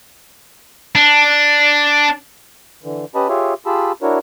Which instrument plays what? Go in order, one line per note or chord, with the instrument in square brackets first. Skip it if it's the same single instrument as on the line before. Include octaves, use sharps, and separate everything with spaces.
[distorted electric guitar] D4
[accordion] D3 E3
C#4 G4 B4 D#5 A5 B5
F4 G4 G#4 C#5 E5
F4 G4 G#4 A5 B5 E6
D4 E4 F#4 A#4 C#5